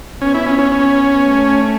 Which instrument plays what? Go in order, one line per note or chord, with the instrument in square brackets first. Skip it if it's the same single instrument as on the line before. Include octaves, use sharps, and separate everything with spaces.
[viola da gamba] B3 [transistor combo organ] C#4
[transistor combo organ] E4
C#4
C#4
C#4
[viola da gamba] A3